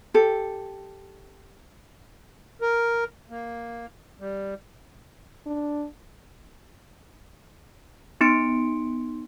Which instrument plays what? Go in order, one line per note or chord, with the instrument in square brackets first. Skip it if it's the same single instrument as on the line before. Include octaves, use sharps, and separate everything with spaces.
[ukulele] G4 A4
[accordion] A#4
A#3
G3
[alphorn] D4
[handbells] B3 D#4 C6 C#7 D7